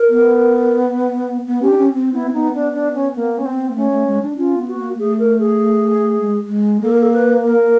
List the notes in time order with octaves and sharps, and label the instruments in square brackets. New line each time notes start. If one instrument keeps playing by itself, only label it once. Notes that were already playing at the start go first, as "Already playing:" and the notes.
Already playing: [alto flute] A#4
[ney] B3
B3
[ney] C#4 [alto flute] G4
[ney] D4
C#4
C4
[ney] B3 [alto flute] E4
[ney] C4
[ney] B3 [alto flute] D#4
[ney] B3 [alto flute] D4
[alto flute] D4
C#4
A#3
C#4
C4
[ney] A#3
[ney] A3 [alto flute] C#4
[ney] A3
G#3
D4
[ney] C#4 [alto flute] F4
[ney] B3
[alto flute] F#4
[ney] A#3
[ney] A3 [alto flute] G#4
[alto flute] A#4
G#4
[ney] G#3
G#3
[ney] A#3 [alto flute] A4
[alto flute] A#4
A4
B4
A#4